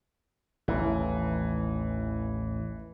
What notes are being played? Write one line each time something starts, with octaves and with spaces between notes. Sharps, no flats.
A1 D#2 E3